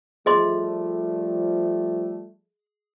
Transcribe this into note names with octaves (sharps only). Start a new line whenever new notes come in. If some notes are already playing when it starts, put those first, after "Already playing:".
F3 G3 A3 G#4 D#5 C6